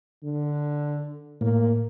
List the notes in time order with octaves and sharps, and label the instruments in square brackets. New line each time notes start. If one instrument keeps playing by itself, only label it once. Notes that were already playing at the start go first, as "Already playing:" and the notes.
[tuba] D3
[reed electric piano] A2 [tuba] A#3